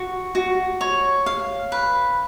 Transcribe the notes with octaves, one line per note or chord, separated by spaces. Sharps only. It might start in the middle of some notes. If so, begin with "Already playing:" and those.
Already playing: F#4
F#4
C#5
F5
B4